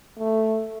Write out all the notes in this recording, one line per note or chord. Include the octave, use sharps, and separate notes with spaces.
A3